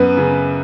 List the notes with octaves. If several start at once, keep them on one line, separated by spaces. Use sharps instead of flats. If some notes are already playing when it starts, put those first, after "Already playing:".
Already playing: F#2 B3 B4
C#3